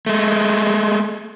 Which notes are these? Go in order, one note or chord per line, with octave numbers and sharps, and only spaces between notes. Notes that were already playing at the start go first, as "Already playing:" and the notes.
G#3 A3